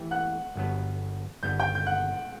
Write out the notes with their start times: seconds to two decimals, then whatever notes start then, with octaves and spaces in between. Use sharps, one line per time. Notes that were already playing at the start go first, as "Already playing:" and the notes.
Already playing: E3 A3 E4 G4
0.11 F#5 F#6
0.56 G1 G2 F#3 B3
1.43 G1 G2 D#3 G3 B3 G6
1.60 G5 G6
1.75 G6
1.87 F#5 F#6